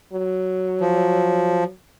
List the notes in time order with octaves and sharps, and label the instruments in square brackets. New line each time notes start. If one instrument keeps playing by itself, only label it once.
[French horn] F#3
[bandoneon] F3